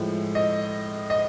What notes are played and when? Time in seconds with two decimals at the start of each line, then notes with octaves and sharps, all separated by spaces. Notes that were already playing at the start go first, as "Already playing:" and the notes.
Already playing: A2 F3 G#3
0.35 D#5
1.10 D#5